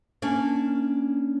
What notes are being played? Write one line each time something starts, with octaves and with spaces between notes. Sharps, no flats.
A#3 C#4 D4